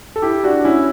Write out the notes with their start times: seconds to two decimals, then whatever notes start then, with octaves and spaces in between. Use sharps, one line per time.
0.16 A4
0.22 E4 G4
0.44 D4 F#4
0.64 C#4 E4